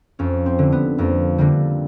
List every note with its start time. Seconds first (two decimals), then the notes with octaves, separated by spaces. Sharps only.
0.19 F2 C#4
0.46 C4
0.59 D3 G3
0.72 B3
0.98 F2 A#3
1.38 D3 G3 A#3